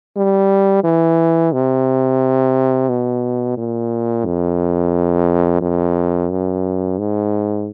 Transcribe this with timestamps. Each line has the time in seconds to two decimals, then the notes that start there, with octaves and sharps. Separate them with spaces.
0.16 G3
0.84 E3
1.53 C3
2.89 B2
3.57 A#2
4.26 F2
5.61 F2
6.31 F#2
6.99 G#2